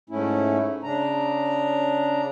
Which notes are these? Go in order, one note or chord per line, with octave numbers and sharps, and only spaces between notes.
G#2 A3 C#4 E4
C#3 D4 A#5